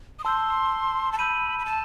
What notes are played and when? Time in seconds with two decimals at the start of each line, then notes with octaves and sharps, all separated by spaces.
0.19 D#6
0.24 A5 C6 E6 G6
1.12 A5
1.18 B5 E6 G6 D#7
1.59 B5
1.65 A5